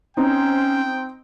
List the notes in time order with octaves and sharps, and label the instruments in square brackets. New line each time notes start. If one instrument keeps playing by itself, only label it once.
[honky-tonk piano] C4 D#4 [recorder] C#4 [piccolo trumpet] G5